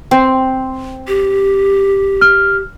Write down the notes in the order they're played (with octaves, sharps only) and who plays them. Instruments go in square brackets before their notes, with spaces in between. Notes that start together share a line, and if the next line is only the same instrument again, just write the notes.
[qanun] C4
[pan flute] G4
[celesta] F6